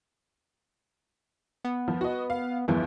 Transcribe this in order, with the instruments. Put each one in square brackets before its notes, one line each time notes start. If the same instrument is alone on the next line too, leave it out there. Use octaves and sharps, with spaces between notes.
[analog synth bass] B3
[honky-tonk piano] F3
F#4 D#5
F5
[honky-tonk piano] G1 E2 F3 [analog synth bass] E3